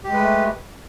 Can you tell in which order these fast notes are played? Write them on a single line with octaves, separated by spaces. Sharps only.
G4 G#3 B4 A3